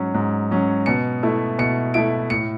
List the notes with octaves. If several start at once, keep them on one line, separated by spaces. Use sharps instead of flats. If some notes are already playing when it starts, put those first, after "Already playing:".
Already playing: G#2 F#3 C#4
G#2
F#3 C#4
B2 C#7
A3 E4
B2 C#7
A3 E4 D7
A2 C#7